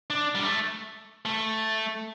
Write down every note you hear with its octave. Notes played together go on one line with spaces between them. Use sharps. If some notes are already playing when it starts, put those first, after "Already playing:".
D4
G3
A3
A3